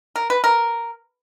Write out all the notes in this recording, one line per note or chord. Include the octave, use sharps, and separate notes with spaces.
A#4
B4
A#4